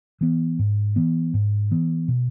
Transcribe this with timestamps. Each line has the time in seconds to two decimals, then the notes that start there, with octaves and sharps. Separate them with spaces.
0.21 E3 B3
0.59 G#2
0.96 E3 B3
1.34 G#2
1.71 E3 B3
2.08 B2